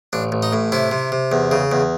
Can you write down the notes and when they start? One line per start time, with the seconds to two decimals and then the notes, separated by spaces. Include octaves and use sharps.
0.13 A1 D4
0.32 A1
0.43 D#4
0.53 A2
0.72 C3 E4
0.91 C3
1.12 C3
1.32 E2
1.51 C#3
1.72 E2